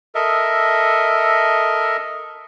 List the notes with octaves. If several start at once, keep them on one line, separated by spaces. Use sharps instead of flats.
A4 A#4 D#5 E5